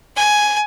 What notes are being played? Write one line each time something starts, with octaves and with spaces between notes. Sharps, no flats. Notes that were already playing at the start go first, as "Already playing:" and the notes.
G#5